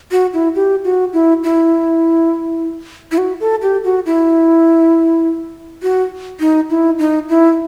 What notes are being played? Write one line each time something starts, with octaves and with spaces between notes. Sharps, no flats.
F#4
E4
G4
F#4
E4
E4
E4
F#4
A4
G4
F#4
E4
F#4
D#4
E4
D#4
E4